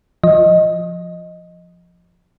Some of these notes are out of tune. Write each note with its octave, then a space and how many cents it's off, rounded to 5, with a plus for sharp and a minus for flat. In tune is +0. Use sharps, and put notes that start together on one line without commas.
F3 +0 D#5 +0